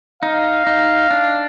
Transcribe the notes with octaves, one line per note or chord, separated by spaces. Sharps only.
D#4 F5
D#4
D4